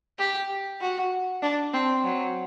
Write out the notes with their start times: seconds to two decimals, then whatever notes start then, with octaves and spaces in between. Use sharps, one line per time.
0.18 G4
0.81 F#4
1.42 D4
1.74 C4
2.04 F#3